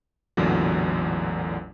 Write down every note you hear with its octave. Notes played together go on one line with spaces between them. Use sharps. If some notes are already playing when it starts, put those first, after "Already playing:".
A1 E2 A#2 D3 F#3